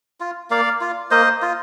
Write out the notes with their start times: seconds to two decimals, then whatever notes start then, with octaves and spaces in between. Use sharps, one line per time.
0.20 F4
0.50 A#3 D5 F5
0.81 F4
1.11 A#3 C5 D#5
1.42 F4